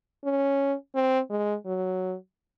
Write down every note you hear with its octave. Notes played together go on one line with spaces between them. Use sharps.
C#4
C4
G#3
F#3